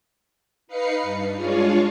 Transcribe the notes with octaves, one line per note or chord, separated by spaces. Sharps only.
D#4 B4 F5 C7 C#7
G2
G#3 D4 F4 G#4 C#5 F5